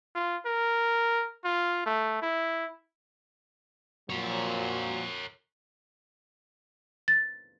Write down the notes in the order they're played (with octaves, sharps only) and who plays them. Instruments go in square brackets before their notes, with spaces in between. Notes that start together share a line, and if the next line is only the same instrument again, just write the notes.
[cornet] F4
A#4
F4
A3
E4
[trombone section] A#2 F3 F#3 [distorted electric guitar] A#4 C#5
[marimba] A6